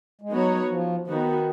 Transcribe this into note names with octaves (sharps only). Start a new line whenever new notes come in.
G#3
F#3 B3 D#4 F#4 C#5
F3
D#3 B3 D#4 F#4